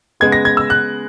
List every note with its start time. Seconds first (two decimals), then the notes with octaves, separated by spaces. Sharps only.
0.20 C#3 G#3 B3 G#6
0.32 A#6
0.45 G#6
0.57 E6
0.70 F#6